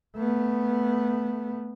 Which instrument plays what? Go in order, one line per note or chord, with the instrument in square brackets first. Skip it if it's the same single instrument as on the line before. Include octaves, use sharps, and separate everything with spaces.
[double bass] A3 B3